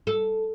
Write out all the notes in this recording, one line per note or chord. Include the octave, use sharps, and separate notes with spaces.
A4